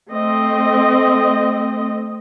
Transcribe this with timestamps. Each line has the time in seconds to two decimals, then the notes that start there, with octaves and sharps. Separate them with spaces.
0.11 A3 C4 D#5